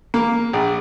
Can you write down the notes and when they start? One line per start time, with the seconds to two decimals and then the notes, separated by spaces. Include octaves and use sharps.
0.14 A#3
0.53 A#1